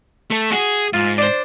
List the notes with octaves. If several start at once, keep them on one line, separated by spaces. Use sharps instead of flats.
A3 A4
F#4 G#4
G#2 F4
D4 C5